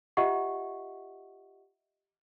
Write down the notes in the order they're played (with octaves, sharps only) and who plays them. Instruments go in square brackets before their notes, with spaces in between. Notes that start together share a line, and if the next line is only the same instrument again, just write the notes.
[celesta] F4 G4 D#5 E5 F#5 C#6